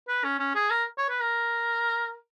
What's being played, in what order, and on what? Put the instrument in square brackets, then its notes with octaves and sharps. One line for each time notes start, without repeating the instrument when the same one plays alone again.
[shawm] B4
C#4
C#4
G#4
A#4
C#5
B4
A#4